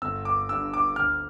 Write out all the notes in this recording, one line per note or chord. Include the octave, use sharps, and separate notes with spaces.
G1 E6
D6
G2 D3 E6
D6
D2 F6